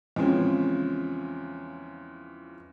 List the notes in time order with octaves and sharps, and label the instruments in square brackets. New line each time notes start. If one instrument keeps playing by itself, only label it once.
[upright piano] E2 C#3 F3 G#3 C4 C#4